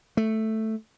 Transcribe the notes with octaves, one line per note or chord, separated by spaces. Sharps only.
A3